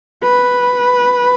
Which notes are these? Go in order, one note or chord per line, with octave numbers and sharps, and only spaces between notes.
B4